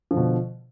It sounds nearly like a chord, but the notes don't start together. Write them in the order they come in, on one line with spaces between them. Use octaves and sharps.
F3 D3 B2